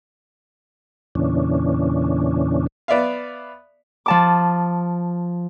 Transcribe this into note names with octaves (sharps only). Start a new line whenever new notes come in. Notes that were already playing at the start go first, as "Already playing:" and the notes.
E2 A#2 C#3 E3 C#4 D4
B3 D5 E5 F5
F3 A5 D6